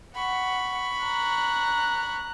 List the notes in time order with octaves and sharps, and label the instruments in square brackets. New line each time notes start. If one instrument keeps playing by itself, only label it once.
[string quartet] F#5 [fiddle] B5 C#6
[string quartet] A#5 F#6